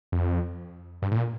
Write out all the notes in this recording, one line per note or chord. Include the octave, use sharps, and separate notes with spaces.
F2
G2
A2
A#2